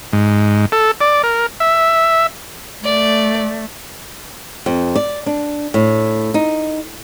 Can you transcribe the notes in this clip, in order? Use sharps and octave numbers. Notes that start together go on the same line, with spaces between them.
G#2
A4
D5
A#4
E5
A3 D5
F2
D5
D4
A2
D#4